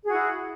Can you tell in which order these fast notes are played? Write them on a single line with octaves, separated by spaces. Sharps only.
G#4 F#4 E4